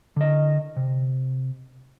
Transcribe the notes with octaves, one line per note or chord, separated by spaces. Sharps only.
D3 D#5
C3